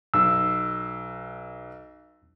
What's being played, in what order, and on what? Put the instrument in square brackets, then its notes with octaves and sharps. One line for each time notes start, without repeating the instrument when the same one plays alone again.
[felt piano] B1 [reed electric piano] E6